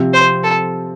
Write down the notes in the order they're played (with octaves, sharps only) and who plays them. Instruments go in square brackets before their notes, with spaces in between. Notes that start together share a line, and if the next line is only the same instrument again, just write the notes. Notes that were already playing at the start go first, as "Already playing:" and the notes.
Already playing: [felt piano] C3 F3 C4
[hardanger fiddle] C5
A4